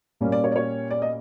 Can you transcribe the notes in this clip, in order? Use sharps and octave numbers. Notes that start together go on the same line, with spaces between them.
A#2 G3 A#3 C#4
D5
C#5
D5
C#5
D5
D#5